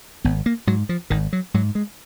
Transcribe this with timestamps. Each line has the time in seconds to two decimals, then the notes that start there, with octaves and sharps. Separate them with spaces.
0.24 G#1 B3
0.46 A#3
0.67 G#2 F#3
0.89 F3
1.10 G#1 D#3
1.33 F#3
1.54 G#2 F#3
1.75 G#3